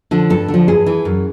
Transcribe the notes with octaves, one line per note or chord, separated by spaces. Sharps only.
D3 F3
G2 A4
D3
F3
G2 G#4
E3
F#2